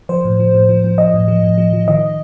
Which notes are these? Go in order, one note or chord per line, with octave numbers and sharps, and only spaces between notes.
F3 C5
A2
F3
A2
F3
F3
F3 D#5
A2
F3
A2
F3
F3
D#3 D#5